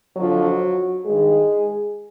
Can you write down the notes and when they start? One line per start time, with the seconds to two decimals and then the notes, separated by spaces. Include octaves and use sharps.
0.17 F2 D3 F3 F#3 F#4
1.06 G2 D#3 G#3 G#4